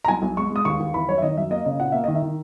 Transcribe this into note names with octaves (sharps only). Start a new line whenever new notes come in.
A#5
B1 G#5
B1
G#3 C#6
G#3
D#6
D#2 C#6
D#2
E3 B5
F#2 C#5
E5
D#3 D#5
F#2 E5
A#3 D#5
C#3 D#5
A#2 F#5
A#3 E5
D#3 D#5
E5
D#3